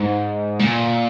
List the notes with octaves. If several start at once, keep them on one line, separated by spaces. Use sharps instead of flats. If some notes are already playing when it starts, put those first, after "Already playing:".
Already playing: G#2
A#2